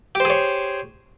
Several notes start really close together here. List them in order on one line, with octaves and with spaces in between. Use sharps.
G4 C5 G#4 C#5